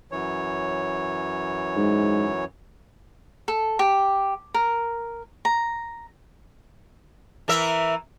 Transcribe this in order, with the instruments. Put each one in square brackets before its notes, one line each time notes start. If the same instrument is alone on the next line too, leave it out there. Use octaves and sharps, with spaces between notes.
[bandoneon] F#2 E3 C#5
[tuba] G#2
[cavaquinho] A4
G4
A#4
A#5
[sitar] E3 A#4 E5